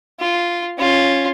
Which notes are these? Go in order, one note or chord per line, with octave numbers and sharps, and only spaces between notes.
F4
C#4 F4